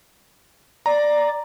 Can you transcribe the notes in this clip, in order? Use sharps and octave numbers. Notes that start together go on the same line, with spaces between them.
D5 A#5